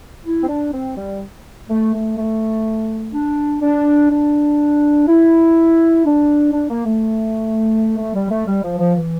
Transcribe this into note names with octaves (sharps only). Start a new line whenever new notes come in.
E4
C4
D4
C4
G3
A3
A3
A3
D4
D4
D4
E4
D4
D4
A#3
A3
A3
G3
A3
G3
F3
F3
E3